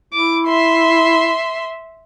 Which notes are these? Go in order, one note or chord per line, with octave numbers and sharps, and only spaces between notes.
E4 D6
E5 C6